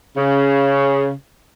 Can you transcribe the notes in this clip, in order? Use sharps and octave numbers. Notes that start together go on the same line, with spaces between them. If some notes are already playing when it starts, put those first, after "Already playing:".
C#3